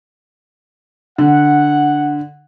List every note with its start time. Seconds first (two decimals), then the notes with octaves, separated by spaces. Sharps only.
1.18 D3 F#5